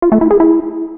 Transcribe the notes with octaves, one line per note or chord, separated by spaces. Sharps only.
F4
A3
E4
G#4
E4